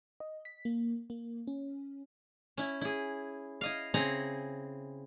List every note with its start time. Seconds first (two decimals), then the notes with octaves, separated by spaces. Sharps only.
0.20 D#5
0.45 B6
0.65 A#3
1.10 A#3
1.47 C#4
2.57 C#4 E4
2.81 E4 G#4
3.61 E4 D#5 F5
3.94 C#3 C4 E4 G#4 A#5